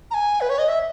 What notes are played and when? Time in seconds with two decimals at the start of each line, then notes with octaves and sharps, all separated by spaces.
0.11 A#5
0.14 G#5
0.41 B4
0.50 C#5
0.59 D#5
0.69 E5